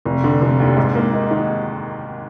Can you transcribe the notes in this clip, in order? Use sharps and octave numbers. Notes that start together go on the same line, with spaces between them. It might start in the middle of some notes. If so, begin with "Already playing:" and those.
F1
D3
F1
D#2
G#2
A#3
D#4
D#3